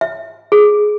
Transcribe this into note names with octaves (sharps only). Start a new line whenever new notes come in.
E5
G#4